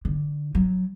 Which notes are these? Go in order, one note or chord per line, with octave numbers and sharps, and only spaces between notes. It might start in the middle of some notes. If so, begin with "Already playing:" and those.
D3
F#3